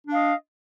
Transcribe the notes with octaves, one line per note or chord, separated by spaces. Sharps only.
D4 D#5 F5